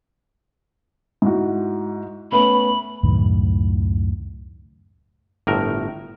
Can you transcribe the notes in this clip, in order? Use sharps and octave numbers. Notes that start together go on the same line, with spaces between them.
G#2 E4 F#4
A3 B3 C#4 B5
C#2 F#2 A2 D#3
G1 A2 A#4